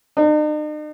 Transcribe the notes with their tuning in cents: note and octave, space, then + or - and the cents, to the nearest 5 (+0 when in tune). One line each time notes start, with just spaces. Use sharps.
D#4 -45